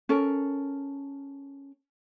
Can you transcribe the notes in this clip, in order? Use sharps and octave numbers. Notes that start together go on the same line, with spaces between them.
C#4 A4 A#4